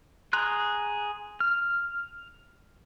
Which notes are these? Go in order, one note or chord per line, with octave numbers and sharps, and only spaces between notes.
G#4 A#5 C6 F#6
F6